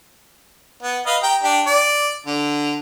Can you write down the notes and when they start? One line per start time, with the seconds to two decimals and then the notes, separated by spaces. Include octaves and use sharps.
0.83 B3
1.06 B4 D#5 F5
1.23 G4 G5 A#5
1.43 D4 G4
1.67 D5
2.27 D3